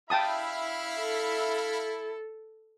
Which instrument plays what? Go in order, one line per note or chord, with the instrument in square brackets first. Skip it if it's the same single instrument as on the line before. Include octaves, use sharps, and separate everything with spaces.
[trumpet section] E4 [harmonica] E5 F5 B5 [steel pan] G5 A5 D#6
[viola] A4